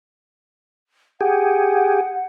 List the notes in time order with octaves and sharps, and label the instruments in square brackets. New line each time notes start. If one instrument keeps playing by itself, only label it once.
[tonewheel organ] G4 G#4 [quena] F#5